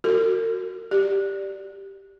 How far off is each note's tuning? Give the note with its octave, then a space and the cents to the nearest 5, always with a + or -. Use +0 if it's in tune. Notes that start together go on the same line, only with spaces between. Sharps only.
F#4 +0 A#4 -40
G4 +0 D5 +0